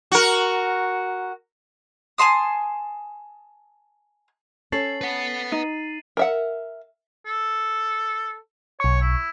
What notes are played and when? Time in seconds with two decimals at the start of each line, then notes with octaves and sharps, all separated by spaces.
0.12 F#4 A#4
2.18 G#5 A5 C6 D#6
4.72 C#4 A4 C#5 A6 C7 F#7
5.01 B4 F#5
5.52 D#4 D#7
6.17 A#4 E5 F#5
7.26 A4
8.80 B1 C#5 C#6
9.01 E4